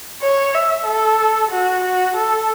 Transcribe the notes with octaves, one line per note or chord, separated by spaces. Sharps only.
C#5
E5
A4
F#4
F#4
A4